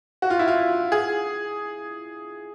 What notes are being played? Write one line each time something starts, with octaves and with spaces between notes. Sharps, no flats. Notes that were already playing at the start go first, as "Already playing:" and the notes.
F#4
F4
E4
F4
G#4